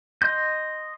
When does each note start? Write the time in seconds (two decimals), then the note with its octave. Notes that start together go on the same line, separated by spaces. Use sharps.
0.22 D#5 C6 G6